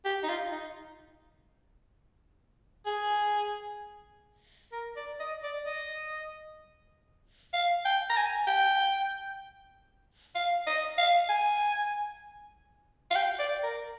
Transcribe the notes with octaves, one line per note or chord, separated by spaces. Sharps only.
G4
D#4
F4
D#4
G#4
A#4
D5
D#5
D5
D#5
F5
G5
A#5
G#5
G5
F5
D#5
F5
G#5
F5
G5
D5
A#4